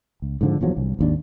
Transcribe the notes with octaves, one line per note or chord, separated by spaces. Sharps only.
C#2
G#2 D3 F3
D#1 E2 F3 F#3
C2
G#1 D#2 D4